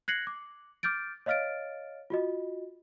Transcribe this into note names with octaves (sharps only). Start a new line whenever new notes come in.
F#6 G#6 A#6 C7 C#7 F#7
D6
D6 F6 G6 A6 D7
C#5 D#5 F5 F6 A6 D7
F4 F#4 D#5